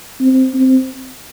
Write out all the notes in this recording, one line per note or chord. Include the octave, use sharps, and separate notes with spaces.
C4
C4